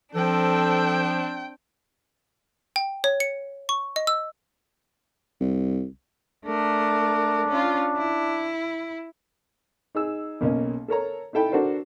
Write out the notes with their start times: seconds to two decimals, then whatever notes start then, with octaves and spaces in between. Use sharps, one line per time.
0.15 F3 C4 D4 A4 G5
2.76 G5
3.04 C#5
3.20 C#7
3.69 C#6
3.96 D#5
4.07 E6
5.40 C2
6.46 A3 D4 A#4
7.48 C#4 F4
7.97 E4
9.95 D#4 G#4 E6
10.41 B1 A#3 C#4 D#5
10.88 A4 A#4 C#5 A#5
11.33 D#4 E4 A4 G5 B5
11.52 D4 F#4 A4 A#4 C5